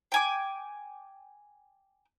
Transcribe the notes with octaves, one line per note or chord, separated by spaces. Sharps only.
G5 G#5 D6